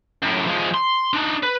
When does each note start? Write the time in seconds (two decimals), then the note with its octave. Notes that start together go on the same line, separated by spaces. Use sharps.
0.22 F#2 A2
0.47 F3 G#3
0.74 C6
1.13 D4 D#4
1.43 B4